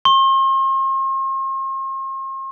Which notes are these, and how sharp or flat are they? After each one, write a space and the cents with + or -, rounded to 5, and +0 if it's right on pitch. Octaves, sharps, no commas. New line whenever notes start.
C6 +45